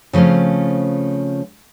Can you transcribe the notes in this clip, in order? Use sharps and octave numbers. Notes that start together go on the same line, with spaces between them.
C#3 F3 A3 C4 C#4